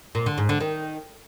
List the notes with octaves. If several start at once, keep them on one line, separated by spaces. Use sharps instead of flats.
A#2
D3
G#2
D3
D#3